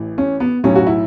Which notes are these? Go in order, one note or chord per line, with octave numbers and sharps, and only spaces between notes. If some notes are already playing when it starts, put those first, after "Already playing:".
Already playing: A1 A2 E3
C#4
B3
B1 A2 F#3 C#4
F#4
E4